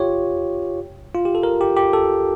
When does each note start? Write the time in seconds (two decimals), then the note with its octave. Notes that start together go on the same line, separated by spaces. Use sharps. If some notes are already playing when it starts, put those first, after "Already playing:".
Already playing: F4 G4 C#5
1.15 F4
1.25 G4
1.35 A4
1.43 A#4
1.61 G4
1.76 G4
1.93 A4